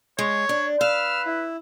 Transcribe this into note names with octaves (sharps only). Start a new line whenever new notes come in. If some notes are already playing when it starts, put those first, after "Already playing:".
G#3 C#5
D4
B4 F5 E6 F6
E4